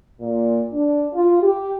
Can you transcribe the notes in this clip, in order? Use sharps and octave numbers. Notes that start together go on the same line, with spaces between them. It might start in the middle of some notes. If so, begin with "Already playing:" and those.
A#2
D4
F4
G4